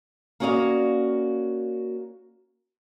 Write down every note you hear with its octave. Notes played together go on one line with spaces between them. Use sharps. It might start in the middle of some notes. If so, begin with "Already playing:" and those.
A#3 C#4 F#4 D5 D#5 F5